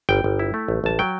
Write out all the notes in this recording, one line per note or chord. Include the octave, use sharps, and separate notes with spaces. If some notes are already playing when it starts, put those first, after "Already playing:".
G1 G5
G1
E4
A3
A1
A1 A5
F#3 G5